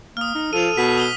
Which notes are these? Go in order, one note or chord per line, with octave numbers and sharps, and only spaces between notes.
A#3 D#6 F6
D#4
F3 A4 D#7 F7
B2 B6
D#6 G7